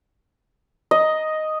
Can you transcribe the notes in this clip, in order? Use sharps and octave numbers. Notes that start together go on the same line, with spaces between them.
D#5